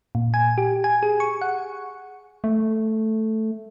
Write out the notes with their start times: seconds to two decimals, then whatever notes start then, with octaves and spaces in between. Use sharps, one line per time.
0.15 A#2
0.34 G#5
0.58 G4
0.84 G#5
1.03 G#4
1.20 C#6
1.42 F#5
2.44 A3